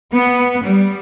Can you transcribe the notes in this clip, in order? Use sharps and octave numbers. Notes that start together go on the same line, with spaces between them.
B3
G3